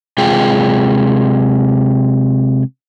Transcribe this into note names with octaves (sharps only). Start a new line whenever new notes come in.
C3 G#3 F4 G#4 G5